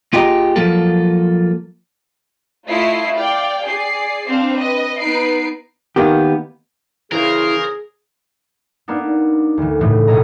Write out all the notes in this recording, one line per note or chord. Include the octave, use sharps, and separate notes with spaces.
A#3 F4 G4 G#4 D#5 A#5
F3 F#3 A#3 F4 A4
A3 E4 F4 D#5 C7
D5 F5 G5
G#4 D5 C7
C4 D4 C5 F5
B4 D#5
B3 D#4 B4 C7 D7
D#3 A#3 B3 G4
C#3 E3 G#4 A#4 C5
A#3 B3 D4 D#4
D2 E3
A2 C#3 E3 A3
A#1 B2 C#4 A4 D#5 A#5